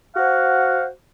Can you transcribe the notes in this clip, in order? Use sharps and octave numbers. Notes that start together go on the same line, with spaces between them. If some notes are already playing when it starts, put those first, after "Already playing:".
F#4 C5 F5 F#5